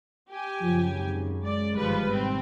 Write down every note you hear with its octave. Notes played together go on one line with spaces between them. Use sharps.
G4 G#5
F#2 C#3 F3
G#1
G#3 D5
G1 D#3 F3 G3 B4
G#1 B2 C4